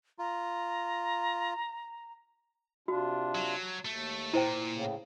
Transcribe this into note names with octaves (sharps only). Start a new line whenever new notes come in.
F4 A#5
C3 D4 F4 F#4
F#3
D#2 A3
A#2 E4 C5 G5
A2 C#3